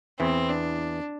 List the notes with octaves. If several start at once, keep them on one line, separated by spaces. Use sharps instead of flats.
E2 E3 C4
D4